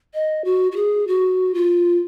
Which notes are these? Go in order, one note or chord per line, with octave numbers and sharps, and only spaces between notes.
D#5
F#4
F#4
G#4
F#4
F4